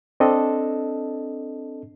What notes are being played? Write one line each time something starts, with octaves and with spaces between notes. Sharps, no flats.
C4 D4 A4 D#5